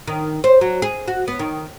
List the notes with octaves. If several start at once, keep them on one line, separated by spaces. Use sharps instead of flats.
D#3
C5
F#3
G#4
F#4
B3
D#3